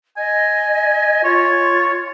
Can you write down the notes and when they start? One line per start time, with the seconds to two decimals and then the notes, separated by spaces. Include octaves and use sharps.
0.17 D#5 G#5
1.24 F4 C#5